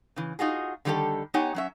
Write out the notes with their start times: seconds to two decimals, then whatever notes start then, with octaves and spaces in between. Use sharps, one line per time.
0.16 C#3 E3
0.39 D#4 F4 F#4 G#4
0.85 D3 D#3 G3 F4 G4 A4
1.34 B3 D#4 G4 C#5 F#5 G#5
1.55 F#3 C#4 E5